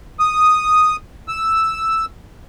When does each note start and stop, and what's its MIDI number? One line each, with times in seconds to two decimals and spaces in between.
0.19 0.96 87
1.28 2.05 88